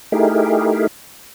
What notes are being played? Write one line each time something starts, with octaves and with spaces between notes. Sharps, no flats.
A3 D#4 E4 G4 G#4 A#4